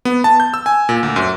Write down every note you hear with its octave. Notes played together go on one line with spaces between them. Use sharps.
B3
A5
G6
E6
G#5
A#2
D2
F#2